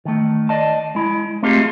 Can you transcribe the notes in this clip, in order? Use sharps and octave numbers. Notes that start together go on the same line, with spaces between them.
D#3 A3
D5 D#5 A5
G#3 E4
A3 C4 D#4 F4 G4 G#4